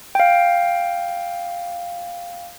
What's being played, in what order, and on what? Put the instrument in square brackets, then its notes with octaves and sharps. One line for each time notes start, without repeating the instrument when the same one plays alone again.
[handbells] F5 G5